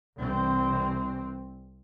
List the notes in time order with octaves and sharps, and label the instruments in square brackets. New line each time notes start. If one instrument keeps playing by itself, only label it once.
[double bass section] C2 E3 C4